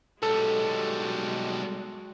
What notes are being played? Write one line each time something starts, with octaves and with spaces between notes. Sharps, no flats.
B1 G3 G#3 F#4 A4